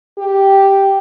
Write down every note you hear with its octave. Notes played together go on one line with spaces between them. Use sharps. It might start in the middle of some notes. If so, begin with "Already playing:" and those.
G4